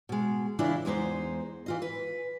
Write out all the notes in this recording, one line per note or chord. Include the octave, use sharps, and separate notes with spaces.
B2 G#3
C#3 E3 D4 E4 F4
E2 G#3 D#4 C5
E3 F4 D#5
B4